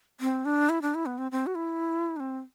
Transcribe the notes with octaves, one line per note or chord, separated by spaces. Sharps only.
C4
D4
E4
D4
E4
B3
C4
C4
F#4
E4
D4
C4